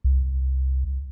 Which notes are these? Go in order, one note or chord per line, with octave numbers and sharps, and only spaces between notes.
C2